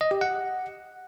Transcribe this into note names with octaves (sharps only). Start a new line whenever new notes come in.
D#5
G4
F#5